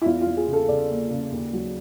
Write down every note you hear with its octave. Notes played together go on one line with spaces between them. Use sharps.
E4
E2 F4
F4
E2
G#4
C#3
A4
C#3 D5
A#3
C#3
D#2
F#3